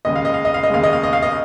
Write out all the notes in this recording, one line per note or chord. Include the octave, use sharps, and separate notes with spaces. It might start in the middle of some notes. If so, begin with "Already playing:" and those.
D#2 C#3 G#3 D#5
F5
D#5
F5
D#5
F5
D#5
D#2 C#3 G#3 F5
D#5
F5
D#5
F5
D#5